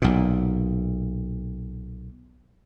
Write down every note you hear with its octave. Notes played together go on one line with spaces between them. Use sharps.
B1 A#2